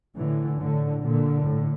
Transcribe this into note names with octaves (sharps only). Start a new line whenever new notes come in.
A2 D3 E3
A2 D3
A#2 D3
A2